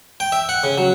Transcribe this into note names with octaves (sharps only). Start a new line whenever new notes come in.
G5
E5
F#5
C#3
F#3